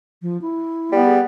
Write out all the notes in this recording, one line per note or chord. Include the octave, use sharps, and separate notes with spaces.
F3
E4
G3 B3
G#4